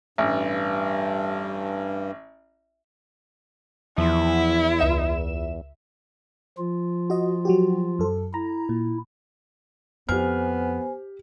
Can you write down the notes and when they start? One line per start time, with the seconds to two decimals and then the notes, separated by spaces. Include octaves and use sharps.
0.18 A1 G2
3.98 E2 F3 E4
4.79 C#2 E5 E7
6.58 F3 F4
7.10 F#4 D#5
7.45 F#3 F#4 G4
7.99 F#2 A4
8.34 E4 A#5
8.69 A#2
10.09 F2 B3 G4 C5 G#5 F6